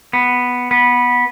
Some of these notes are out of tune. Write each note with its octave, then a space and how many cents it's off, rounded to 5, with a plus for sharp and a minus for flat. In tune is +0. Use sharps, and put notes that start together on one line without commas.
B3 +0
B3 -15